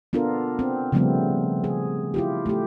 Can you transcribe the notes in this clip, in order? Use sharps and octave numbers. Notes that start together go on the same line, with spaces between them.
B3 D4 F4 A4 A#4
C4
C#3 F3 G3 A3 B3 C4
G#4
E4 F4 G4
A3 G4